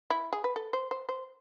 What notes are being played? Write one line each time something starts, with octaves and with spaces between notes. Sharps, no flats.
E4
G#4
B4
A4
C5
C5
C5